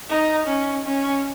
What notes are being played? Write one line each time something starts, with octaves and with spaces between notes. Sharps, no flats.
D#4
C#4
C#4